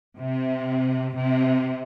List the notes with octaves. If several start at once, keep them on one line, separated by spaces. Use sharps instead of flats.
C3
C3